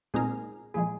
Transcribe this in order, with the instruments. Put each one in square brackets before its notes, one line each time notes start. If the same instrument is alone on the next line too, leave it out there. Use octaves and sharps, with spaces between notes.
[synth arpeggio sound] A#2 G#3 C4 D#4 A#4 [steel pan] G#4
[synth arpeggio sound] A#2 F3 G#3 [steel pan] G#4